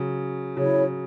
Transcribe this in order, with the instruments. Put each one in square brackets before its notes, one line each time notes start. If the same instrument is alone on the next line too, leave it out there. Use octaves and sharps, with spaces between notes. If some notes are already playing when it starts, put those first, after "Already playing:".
Already playing: [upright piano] C#3 F#3
[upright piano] C#3 F#3 [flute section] E4 G#4 C#5